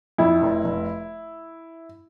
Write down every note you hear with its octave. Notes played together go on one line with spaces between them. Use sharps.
F2 E4
F1
F1